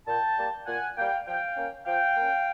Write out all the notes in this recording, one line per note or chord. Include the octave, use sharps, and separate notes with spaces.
A#2 G5 A5
G3 A#3
A#2 F#5 G#5
G3 A#3 F5 G5
F3 F5 G5
A#3 C#4
F3 F5 G5
A#3 C#4